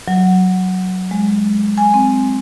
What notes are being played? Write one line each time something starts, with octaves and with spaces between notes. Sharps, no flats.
F#3
G#3
G#5
C4